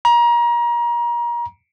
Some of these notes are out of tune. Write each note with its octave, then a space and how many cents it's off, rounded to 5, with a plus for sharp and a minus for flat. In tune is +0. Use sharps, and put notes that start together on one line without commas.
A#5 +30